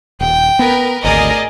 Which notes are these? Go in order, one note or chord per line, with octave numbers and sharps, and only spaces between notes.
D#1 G5
B3 A#4 B4
G#1 D2 G#4 A#4 D5 D#5